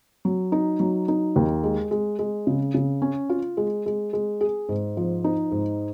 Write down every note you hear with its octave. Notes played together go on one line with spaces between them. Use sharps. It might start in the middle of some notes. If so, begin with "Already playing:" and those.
F#3
D#4
F#3
D#4
D#2
G#3
G#3
G#3
C#3
C#3
C#4
F4
G#3
G#3
G#3
G#4
G#2
F3
D#4
G#2